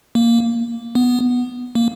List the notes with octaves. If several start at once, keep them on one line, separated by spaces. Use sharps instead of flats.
A#3
B3
A#3